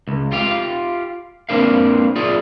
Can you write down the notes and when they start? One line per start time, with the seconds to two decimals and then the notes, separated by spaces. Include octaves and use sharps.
0.08 C#2
0.32 F4 G4 F5
1.49 A#3 C4 D4 A#4 F5
2.16 F4 G#4 D5